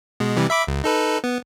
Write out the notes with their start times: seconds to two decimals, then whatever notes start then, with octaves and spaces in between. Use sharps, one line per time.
0.20 B2 G#3
0.37 C3 E3 G3
0.50 E5 B5 D6
0.68 C#2
0.84 D#4 A4 B4
1.24 B3